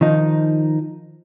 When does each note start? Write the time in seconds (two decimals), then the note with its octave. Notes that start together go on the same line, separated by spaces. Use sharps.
0.01 D#3 F3 D#4